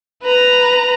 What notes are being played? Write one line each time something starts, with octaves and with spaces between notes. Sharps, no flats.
B4 A#5